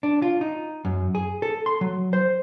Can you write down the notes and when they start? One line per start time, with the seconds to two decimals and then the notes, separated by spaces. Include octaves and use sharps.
0.03 D4
0.22 F4
0.41 D#4
0.85 F#2
1.15 G#4
1.42 A4
1.66 C6
1.81 F#3
2.13 C5